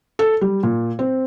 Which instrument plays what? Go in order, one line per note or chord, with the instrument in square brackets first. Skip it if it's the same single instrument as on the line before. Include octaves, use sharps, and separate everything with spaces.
[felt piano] A4
G3
A#2
C4